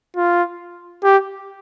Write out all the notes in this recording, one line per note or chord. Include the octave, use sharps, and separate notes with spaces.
F4
G4